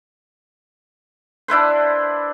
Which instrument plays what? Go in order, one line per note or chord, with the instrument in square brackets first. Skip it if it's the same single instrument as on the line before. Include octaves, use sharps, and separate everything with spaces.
[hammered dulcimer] D4 E4 B4 C5